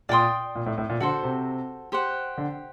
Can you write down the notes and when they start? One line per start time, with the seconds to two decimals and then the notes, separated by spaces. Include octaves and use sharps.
0.09 A#2 D5 G5 C6 D#6
0.55 A#2
0.66 A2
0.78 A2
0.89 A#2
1.00 D3 F#4 A4 C5
1.23 C3
1.92 G4 C5 F#5
2.37 D3